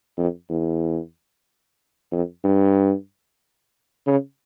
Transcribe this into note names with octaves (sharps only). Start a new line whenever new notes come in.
F2
E2
F2
G2
C#3